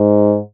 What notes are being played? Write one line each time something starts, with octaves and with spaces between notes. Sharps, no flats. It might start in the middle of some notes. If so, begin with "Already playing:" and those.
Already playing: G#2